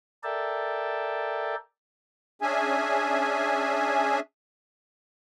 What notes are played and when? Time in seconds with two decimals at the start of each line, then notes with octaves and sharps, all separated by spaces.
0.24 A4 A#4 D5 E5 G5 A5
2.42 C#4 D4 G#4 E5 G#5